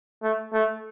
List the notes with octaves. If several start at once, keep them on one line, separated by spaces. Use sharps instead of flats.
A3
A3